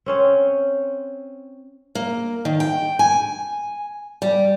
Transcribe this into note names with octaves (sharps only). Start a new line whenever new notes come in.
C4 C#4 C5
A#3
D#3
G5
G#5
G3